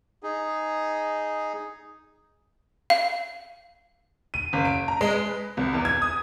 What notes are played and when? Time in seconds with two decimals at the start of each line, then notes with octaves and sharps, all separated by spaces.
0.23 D#4 G#4
2.90 F5
4.34 D#7
4.53 F#1
4.65 D7
4.88 A#5
5.01 G#3
5.13 B4
5.57 C2
5.73 E2
5.85 G#6
6.02 D#6